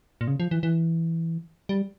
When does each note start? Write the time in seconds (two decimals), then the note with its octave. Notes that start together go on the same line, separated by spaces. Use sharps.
0.21 A#2
0.28 C#3
0.40 F3
0.51 E3
0.63 E3
1.69 G3